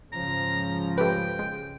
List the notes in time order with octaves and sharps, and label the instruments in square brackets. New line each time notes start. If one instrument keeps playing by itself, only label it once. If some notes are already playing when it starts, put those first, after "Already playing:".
[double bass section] G#2 C#3 F3 [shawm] A#5
[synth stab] A3 G4 B4 [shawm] G5
[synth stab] G#3